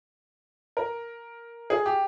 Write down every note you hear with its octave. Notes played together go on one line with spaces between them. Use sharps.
A#4
G#4
G4